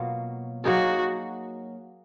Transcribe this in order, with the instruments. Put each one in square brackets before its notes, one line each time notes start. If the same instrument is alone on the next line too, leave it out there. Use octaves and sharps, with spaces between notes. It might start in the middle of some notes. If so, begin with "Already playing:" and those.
Already playing: [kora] B2 F#3 A#3 F4
[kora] F#3 A#3 D#4 G#4 [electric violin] F#4